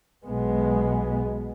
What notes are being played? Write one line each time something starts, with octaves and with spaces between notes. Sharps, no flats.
B1 B2 G#3 B3